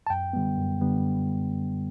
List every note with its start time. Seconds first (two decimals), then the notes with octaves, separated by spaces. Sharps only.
0.07 A5
0.10 F#2 G5
0.33 D3 G3 B3
0.58 F#2
0.81 D3 G3 B3